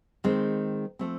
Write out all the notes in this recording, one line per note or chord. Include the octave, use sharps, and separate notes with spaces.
D#3 G#3 C4
F3 A3 C4